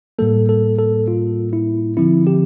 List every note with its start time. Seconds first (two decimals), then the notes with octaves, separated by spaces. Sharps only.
0.19 A2 G3 A#3 A4
0.49 A4
0.78 A4
1.08 F4
1.53 E4
1.97 D3 F3 C4 E4
2.27 G4